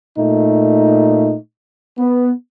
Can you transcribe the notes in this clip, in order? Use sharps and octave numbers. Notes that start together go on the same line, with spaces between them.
A#2 A3 D#4
B3